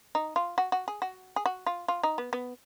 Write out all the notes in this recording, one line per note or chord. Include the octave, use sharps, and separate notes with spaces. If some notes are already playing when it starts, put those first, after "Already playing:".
D#4
F4
F#4
F#4
G#4
F#4
G#4
F#4
F4
F4
D#4
B3
B3